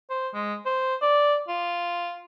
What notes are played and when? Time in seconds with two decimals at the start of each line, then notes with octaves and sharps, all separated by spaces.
0.10 C5
0.34 G#3
0.66 C5
1.02 D5
1.48 F4